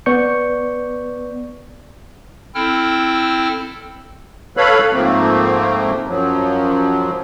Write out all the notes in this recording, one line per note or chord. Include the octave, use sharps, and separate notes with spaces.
B3 B4 D5 C#6 G6 C#7
C4 E4 A4 G5 F6
A4 B4 C#5 F5 B5
G#2 F3 A3 A#3 C4
F#2 F3 F#3